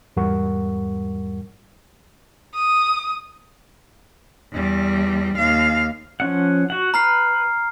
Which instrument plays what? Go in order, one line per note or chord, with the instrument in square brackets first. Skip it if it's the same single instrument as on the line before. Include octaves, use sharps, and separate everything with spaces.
[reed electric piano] E2 G#2 G3 A#4 F#5 C#6
[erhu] D#6
[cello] E2 G3
D#2 F5
[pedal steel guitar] F3 C#4 F#5
F#4 F#5
[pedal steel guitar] B4 [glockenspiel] A#5 F6 C7